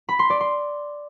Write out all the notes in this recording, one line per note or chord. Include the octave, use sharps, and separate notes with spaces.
B5
C6
D5
C6